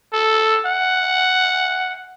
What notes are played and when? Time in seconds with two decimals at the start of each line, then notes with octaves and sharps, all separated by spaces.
0.13 A4
0.66 F#5